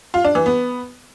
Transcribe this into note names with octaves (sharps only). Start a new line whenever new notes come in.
F4
D4
E3
B3